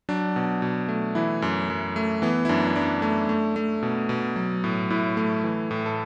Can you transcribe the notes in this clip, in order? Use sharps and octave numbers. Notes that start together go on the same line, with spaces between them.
F#3 D4
B2
B2
A3
E3 E4
F#2
F#2
A3
E3 B3
E4
F#2 D4
E4
F#2 D4
A3
A3
A3
B2
B2
F#3
A2
A2 E4
A3
E3
A2
A4